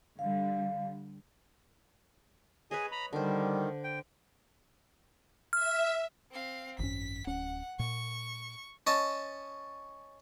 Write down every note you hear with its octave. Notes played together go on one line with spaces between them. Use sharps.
D3 G3 F5
G#4 B4 C#5 D#5 G#5
A#5 B5
D3 D#3 G3 C5
G5
E5 F6
C4 F5
G#1 F#2 C#4 B6
D1 C#4 F#5
A#2 C#6
C#4 D#5 A5